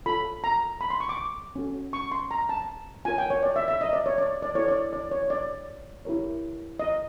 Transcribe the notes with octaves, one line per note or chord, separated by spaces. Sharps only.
F4 A4 C#5 B5
A#5
B5
C6
C#6
D6
C#4 F#4 A4 C#5
C#6
C6
A#5
A5
F4 A#4 C#5 G#5
G5
C#5
D5
E5
E5
D#5
D5
C#5
D5
D5
E4 A4 C5 C#5
D5
D5
C#5
D5
E4 G4 A#4 C#5
D#5